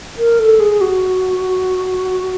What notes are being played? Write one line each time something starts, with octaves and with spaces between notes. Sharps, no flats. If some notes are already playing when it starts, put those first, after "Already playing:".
A#4
A4
G#4
F#4